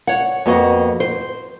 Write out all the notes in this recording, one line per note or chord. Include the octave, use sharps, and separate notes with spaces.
C#5 F#5
F2 A#3 B3 F#4 D#5
C5